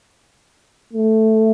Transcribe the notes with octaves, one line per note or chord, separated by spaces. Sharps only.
A3